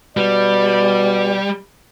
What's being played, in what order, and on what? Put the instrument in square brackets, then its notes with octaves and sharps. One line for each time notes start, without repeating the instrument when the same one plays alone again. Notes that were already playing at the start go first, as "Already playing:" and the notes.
[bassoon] B2 [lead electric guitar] G3 [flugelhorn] D5